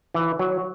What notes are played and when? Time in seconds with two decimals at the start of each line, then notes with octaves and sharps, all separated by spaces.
0.14 E3
0.39 F#3